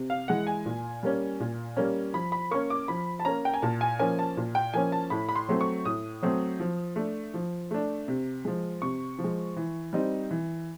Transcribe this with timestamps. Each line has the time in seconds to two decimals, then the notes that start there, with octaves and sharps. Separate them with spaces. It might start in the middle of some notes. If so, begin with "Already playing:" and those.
Already playing: C3
0.10 F5
0.28 E3 G#3 F#5
0.47 G#5
0.66 A#2
1.03 G3 A#3 C#4
1.40 A#2
1.77 G3 A#3 C#4
2.14 F3 B5
2.32 B5
2.51 A#3 C#4 C#6
2.70 D6
2.88 F3 B5
3.20 A5
3.25 A#3 C#4 A#5
3.45 G5
3.54 G#5
3.62 A#2 A5
3.81 G#5
3.99 F3 A#3 C#4 G#5
4.19 A5
4.37 A#2
4.55 G5
4.74 F3 A#3 C#4 G#5
4.92 A5
5.10 A2 B5
5.29 B5
5.36 C6
5.49 F#3 A3 C4
5.61 C#6
5.85 A2 D#6
6.23 F#3 A3 C4
6.60 F3
6.96 A3 D4
7.34 F3
7.71 A3 D4
8.08 C3
8.45 F3 G#3
8.82 C3 C#6
9.19 F3
9.24 G#3
9.57 E3
9.93 G3 C4 D#4
10.31 E3